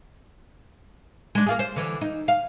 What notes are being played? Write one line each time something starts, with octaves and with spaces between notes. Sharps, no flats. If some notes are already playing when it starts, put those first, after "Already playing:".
G#3 D4
A#3 F4 G#4
C5
D3 E3
D#4
F5